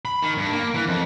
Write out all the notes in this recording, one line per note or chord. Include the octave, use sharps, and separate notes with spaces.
B5
D#3
G2
A#3
E3
F2